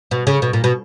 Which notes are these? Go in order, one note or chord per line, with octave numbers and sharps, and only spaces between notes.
B2
C#3
B2
A#2
B2